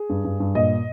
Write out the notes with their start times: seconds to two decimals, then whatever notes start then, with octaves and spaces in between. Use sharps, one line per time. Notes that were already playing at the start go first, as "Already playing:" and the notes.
Already playing: G#4
0.10 G2
0.25 G2
0.40 G2
0.55 A#2 D#5